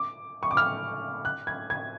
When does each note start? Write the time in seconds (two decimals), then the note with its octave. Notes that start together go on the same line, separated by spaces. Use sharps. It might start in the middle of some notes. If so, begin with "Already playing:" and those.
Already playing: D6
0.43 C#6
0.51 D6
0.57 F6
1.25 F#6
1.47 G#6
1.70 G#6